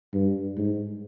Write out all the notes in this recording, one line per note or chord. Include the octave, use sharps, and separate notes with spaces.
G2
G#2